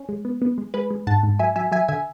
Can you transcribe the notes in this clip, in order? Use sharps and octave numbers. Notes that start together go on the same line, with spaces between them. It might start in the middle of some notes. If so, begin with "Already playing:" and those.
Already playing: C#4
G#3
B3
B3
G#3
G#3 B4
G#3
G#2 F#5 A5
G#2
F#3 E5 G#5
F#3 E5 G#5
F#3 E5 G#5
D3 E5 G#5